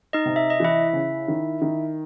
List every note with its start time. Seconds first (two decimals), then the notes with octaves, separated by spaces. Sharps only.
0.13 D#4 D#5
0.26 C3
0.36 E5
0.50 D#5
0.60 E3 E4 E5
0.93 C#3
1.28 D#3
1.62 D#3